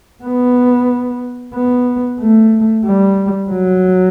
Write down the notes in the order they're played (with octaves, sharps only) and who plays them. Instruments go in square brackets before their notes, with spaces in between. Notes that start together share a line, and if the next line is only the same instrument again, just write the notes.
[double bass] B3
B3
A3
G3
F#3